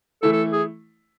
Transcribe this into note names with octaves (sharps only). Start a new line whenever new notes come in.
E3 A3 E4 A4
A4
G#4